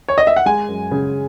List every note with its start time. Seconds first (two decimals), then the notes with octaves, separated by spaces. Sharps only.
0.08 C#5
0.18 D#5
0.27 E5
0.36 F#5
0.46 G#3 G#5
0.68 F#2
0.91 C#3